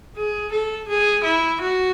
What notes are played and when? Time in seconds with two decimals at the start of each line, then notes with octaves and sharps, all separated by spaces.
0.17 G#4
0.52 A4
0.89 G#4
1.24 E4
1.61 F#4